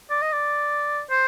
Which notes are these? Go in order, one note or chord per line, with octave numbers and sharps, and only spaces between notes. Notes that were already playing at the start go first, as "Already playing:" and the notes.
D5
D#5
D5
C5